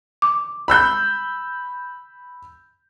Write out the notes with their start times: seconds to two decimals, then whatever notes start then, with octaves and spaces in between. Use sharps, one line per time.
0.22 D6
0.68 B5 E6 G6